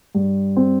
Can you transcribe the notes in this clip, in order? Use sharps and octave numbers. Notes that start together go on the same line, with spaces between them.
G2
C4